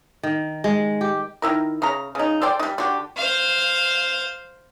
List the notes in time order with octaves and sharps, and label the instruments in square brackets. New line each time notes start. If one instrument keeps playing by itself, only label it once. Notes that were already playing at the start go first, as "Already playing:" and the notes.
[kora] D#3
G#3
G4
[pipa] D#3 E4 A#4
C#3 A#5
C#3 D#4
A4 C5 D5 G5
G3 D#4
D3 F#4 G4
[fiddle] C5 F5